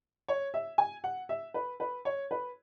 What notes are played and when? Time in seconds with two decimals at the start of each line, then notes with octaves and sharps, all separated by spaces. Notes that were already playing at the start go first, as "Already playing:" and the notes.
0.28 C#5
0.54 E5
0.78 G#5
1.04 F#5
1.29 E5
1.54 B4
1.80 B4
2.05 C#5
2.31 B4